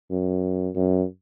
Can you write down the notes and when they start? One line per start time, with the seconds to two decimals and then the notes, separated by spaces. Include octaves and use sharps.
0.11 F#2
0.75 F#2